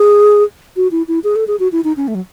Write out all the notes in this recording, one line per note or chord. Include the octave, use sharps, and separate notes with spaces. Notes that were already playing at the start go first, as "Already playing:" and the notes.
Already playing: G#4
F#4
E4
E4
G#4
A4
G#4
F#4
E4
D#4
C#4
A3
F#3